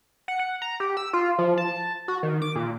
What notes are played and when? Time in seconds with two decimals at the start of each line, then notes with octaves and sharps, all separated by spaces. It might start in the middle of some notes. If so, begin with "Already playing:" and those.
0.28 F#5
0.39 F#5
0.62 A#5
0.80 G4
0.97 E6
1.13 F4
1.39 F3
1.58 A5
2.08 F#4
2.23 D#3
2.42 D6
2.56 A#2